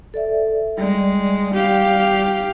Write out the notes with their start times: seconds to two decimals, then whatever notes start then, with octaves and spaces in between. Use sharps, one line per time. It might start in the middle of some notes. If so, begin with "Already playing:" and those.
0.14 A4 D5 E5
0.78 G3 G#3 D5
1.54 G4 F5